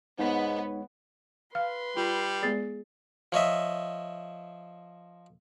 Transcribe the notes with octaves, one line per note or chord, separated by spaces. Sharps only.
C2 G#2 G#3 B3 D#4 C#5
B4 F5 C6 F6
G3 F4
G#3 B3 G#4 D5 A6 C7
F3 C#5 D#5 E5